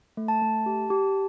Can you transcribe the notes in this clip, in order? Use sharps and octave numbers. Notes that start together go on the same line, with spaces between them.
A3
A5
A3
G4
G4